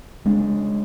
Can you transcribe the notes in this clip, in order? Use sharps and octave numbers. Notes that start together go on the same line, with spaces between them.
C#3 G#3 D4